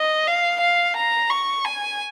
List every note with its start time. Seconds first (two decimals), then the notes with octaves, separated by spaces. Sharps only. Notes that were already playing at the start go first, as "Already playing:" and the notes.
Already playing: D#5
0.27 F5
0.61 F5
0.96 A#5
1.30 C#6
1.65 G#5